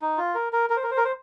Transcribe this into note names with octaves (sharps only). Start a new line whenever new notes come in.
D#4
F4
A#4
A#4
A#4
C5
A#4
C5
A#4
C5